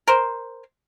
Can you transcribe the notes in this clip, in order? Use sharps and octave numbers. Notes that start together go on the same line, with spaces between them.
A#4 C5